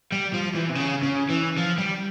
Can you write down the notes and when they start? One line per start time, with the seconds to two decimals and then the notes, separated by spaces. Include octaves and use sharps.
0.12 G3
0.33 F3
0.55 E3
0.69 C3
0.75 C#3
1.03 C#3
1.30 E3
1.57 F3
1.78 G3